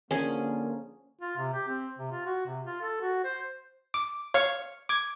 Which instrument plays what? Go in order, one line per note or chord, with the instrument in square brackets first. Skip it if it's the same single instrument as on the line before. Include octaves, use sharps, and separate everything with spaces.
[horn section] D3 F3 A#3 [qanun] C#4 G#4
[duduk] F4
C3
G4
C4
C3
F4
F#4
C3
F4
A4
F#4
C5
[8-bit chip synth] D6
C#5 F5 C#6
D6 G#6